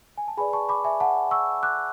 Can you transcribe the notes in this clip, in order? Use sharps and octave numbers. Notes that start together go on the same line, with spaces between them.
G#5
A5
G#4 B4 D5 G#5 B5
A5 C#6
B5 D6
E5 G#5
F#5 A5
C#6 E6
D6 F#6